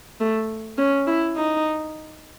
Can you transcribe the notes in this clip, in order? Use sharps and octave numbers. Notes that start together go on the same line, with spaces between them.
A3
C#4
E4
D#4